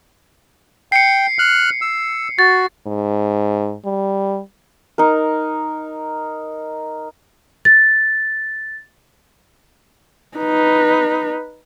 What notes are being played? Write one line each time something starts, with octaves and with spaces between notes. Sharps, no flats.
G5 C7 C#7
F6 F#6
E6
F#4 A6
G#2
G3
D#4 A#4
A6
D#4 B4